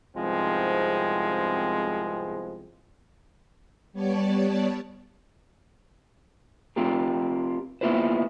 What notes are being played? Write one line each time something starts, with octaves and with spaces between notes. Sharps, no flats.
C2 G#2 F3 G#3 B3 C4
G3 B3 C#5 D5 A5
C4 F4 G4 A#4
A#3 B3 E4 F4 B4 C5